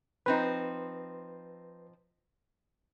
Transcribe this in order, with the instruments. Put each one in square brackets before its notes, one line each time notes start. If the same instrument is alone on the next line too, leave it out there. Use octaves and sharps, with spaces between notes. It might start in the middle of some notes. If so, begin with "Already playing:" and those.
[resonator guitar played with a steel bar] F3 C4 D#4 [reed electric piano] B4